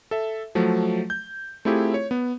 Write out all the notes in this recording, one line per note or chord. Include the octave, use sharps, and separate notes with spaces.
A4 E5
F3 F#3 A3
G6
A3 C4 E4 F4 G4 G#4
C#5
B3